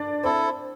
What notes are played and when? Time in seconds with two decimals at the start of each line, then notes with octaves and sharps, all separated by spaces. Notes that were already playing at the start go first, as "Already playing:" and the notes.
Already playing: D4 D5
0.23 C4 E4 A4 C5